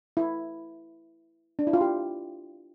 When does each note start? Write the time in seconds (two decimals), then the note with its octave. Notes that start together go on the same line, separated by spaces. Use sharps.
0.17 E4
1.59 D4
1.67 E4
1.73 F4
1.81 G4